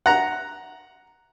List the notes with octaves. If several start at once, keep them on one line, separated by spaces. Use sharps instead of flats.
F#5 A#5